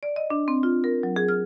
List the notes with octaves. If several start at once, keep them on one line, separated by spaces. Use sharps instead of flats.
D5
D#5
D4
C4
F4
A#4
F#3
G#4
F6